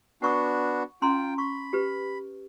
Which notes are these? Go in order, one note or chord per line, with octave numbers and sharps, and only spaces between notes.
B3 D4 F#4 F#5 C#6 D#6
C#4 F4 G5 A#5 C6
B5 C#6
G4 B4